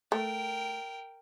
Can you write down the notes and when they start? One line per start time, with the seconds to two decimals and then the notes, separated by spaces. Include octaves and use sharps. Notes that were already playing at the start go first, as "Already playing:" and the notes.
0.12 A3 A#4 G5